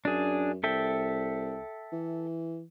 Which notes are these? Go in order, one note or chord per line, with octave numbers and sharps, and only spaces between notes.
F#2 D4 G#4
C2 A4 E5 G5
E3